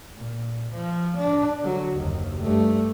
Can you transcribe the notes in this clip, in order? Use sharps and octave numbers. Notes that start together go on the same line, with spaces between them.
A#2
F3
D4
D3 F#3
F#1 D#2
G2 A3